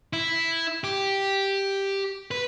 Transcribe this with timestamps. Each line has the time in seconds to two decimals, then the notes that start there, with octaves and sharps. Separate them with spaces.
0.13 E4
0.84 G4
2.31 B4